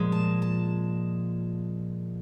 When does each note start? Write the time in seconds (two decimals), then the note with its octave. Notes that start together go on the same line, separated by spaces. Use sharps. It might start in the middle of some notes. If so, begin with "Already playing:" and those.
Already playing: A#2 F3 G#3
0.12 A5
0.42 A5